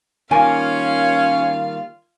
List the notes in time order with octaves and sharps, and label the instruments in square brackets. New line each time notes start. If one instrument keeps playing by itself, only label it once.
[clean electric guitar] D#3 G3 A#3 [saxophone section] C#4 [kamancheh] F4 F5 [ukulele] G#5